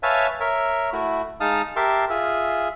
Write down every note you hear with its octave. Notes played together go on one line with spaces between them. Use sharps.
B4 C#5 E5 F5 G#5 A5
A#4 C#5 E5
A3 E4 F#4
G#3 D#4 F5 A5 D#6
G4 A#4 E5 A5 C6
F4 G#4 E5